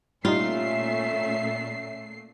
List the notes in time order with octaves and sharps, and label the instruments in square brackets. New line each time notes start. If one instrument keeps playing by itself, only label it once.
[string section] A#2 A3 C7 [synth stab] G3 D#4 [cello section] C#4 E5 [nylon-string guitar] F4